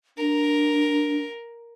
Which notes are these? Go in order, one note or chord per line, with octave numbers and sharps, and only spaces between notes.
D4 A#4